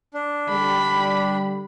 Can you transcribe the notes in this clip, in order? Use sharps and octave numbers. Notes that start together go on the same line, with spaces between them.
D4
D3 G3 B5